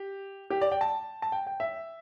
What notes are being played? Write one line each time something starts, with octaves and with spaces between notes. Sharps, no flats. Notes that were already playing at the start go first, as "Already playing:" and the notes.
Already playing: G4
G4
D5
G5
A5
A5
G5
G5
E5